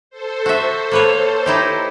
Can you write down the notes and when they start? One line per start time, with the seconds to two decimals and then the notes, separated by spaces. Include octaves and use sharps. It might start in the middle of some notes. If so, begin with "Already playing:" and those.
0.10 A4 C5
0.46 F#4 E5
0.91 A#3 B4 C#5
1.46 D#4 E4 G4